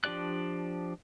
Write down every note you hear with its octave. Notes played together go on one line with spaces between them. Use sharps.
F3 D4 G4 D5 F#6